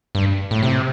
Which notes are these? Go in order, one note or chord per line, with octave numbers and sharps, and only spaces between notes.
G2
A2
C3